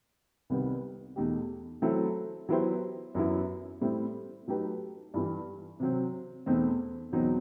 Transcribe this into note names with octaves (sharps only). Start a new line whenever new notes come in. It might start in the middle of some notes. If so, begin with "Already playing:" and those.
C2 C3 D#3 G3 B3
E2 B2 A3 D#4 G4
F#3 A3 C4 E4 A4
F#3 B3 E4 G4 C5
F#2 F#3 B3 E4
A2 G3 C4 E4
F#3 A3 D#4 G4 B4
G2 E3 G3
C3 F#3 C4
E2 B2 A3 C4 D#4
E2 B2 F#3 C4 D#4